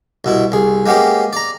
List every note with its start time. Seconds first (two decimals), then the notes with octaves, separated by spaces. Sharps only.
0.24 C2 B2 E4
0.52 C2 G#4
0.86 G#3 A#3 B3 C#4 G4
1.33 D5 A#5